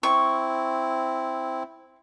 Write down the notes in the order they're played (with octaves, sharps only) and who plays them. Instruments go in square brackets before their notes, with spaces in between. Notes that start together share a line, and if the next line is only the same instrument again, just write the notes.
[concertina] C4 E4 [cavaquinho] C#6